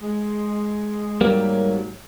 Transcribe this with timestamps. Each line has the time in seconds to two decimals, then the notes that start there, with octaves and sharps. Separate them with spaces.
0.01 G#3
1.21 G#2 D#3 F#3 G3 A#3